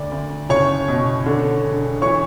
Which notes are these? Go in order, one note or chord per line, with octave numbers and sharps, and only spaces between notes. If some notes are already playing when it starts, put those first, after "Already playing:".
Already playing: D2 D5
D2
F#1 C#5 C#6
B2
D3
E1
E3 C#5 C#6